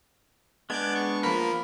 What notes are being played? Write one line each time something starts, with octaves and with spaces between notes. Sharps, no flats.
G#3 B3 D4 D6 G6 G#6
C#6
F3 A#3 A#4 B5